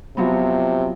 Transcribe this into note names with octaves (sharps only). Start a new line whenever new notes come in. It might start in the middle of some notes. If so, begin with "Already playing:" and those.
C3 F3 F#3 B3